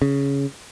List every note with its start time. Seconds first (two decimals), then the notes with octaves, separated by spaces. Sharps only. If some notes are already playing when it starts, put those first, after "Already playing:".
0.02 C#3